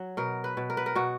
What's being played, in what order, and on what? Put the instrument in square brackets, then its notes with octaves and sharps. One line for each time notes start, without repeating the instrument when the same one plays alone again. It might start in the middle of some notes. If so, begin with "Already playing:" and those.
Already playing: [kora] F#3
B2 A#4
B4
B2
A#4
B4
A#4
B2 F#4